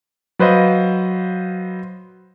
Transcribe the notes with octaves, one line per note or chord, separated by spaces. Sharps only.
F#3 B4 C5 D#5 F5